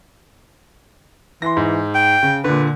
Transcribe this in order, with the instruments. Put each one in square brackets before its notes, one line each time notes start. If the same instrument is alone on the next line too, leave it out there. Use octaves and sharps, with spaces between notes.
[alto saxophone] E3 [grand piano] C6 A#6
[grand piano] G#2
[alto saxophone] G5
[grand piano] C#3
[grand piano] A#2 D3 [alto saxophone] B4